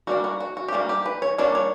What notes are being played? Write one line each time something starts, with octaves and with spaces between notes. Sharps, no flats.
G3 A#3 D4 F#4
F#4
F#4
F#4
G4
G3 A#3 D4 F#4
G4
B4
C#5
G3 A#3 D4 C#5
C#5